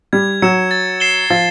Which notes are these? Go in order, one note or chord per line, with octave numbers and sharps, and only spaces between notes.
G3 G#6
F#3 C#7 E7
A6
C7 E7 G7
F3 A6